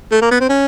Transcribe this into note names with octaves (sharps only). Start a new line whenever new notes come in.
A3
A#3
B3
C4
C#4